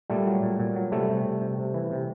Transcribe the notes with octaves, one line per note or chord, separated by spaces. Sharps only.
A#2 G3 A3
F#3
A#2
A#2
F#3
C3 G3 A3
C3
C3
C3
C3
E3
C3